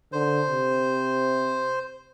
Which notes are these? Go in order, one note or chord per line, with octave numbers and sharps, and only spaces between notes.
D3 C5
C3